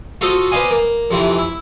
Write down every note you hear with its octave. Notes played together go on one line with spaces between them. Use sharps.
F4 F#4 A4 C5 D#5
B4 C5 D5 D#5 F5 G#5
A#3
F2 C3 E3
E4